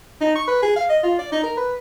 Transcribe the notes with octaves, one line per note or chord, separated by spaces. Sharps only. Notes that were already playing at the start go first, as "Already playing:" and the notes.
D#4
C#6
B4
G#4
F5
D#5
F4
D5
D#4
A#4
B4